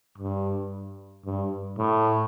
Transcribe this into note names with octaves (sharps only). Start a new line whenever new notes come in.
G2
G2
A2